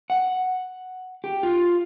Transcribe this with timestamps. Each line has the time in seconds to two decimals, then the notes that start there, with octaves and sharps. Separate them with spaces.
0.10 F#5
1.24 G4
1.43 F4